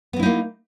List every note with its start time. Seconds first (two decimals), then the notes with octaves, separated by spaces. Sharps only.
0.13 B3
0.16 F#3
0.19 E4
0.23 D#4
0.26 A#3